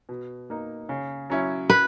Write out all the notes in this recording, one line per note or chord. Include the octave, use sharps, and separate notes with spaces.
B2
A#3 D#4
C#3
F#3 C#4 E4
B4